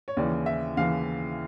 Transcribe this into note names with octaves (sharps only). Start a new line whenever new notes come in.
C#5
D#2 C#3 E3 D5
E5
D#2 C#3 E3 F5